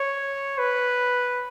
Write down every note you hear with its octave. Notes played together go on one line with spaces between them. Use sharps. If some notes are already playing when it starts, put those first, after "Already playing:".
Already playing: C#5
B4